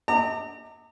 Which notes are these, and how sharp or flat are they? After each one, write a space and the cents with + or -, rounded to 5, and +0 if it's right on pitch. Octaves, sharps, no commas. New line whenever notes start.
D#5 +40 A#5 -35 D6 +20